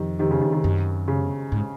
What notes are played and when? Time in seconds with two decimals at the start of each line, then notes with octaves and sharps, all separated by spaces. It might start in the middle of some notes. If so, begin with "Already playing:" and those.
Already playing: F2 C3 D#3
0.19 C3 D#3
0.31 C#3
0.41 C3 D#3
0.52 C3 D#3
0.64 F#2
1.08 C#3
1.52 G#2